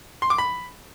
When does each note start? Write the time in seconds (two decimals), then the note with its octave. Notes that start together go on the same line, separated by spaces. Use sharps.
0.22 C6
0.30 D6
0.38 B5